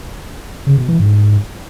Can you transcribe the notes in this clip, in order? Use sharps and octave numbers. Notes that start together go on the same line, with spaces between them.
C#3
B2
E3
G#2